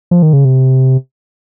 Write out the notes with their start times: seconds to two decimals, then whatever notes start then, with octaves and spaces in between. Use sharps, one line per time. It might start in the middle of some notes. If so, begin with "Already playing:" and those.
0.11 F3
0.22 D#3
0.33 C#3
0.45 C3